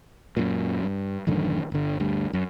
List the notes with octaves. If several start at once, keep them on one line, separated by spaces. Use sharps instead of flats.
F#2 A#2
G2
A1 F#2 D3 D#3
G1 D3
D2 G2
F#2